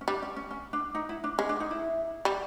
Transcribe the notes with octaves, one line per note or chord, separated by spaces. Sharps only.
C#4
G3 D4
C#4
C#4
C#4
D4
D#4
E4
D4
G#3 C#4
D4
D#4
E4
G3